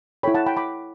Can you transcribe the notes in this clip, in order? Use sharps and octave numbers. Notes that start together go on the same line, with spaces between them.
E4 A4 C#5 G5 B5
F#5 A5
G5 B5
B5 D6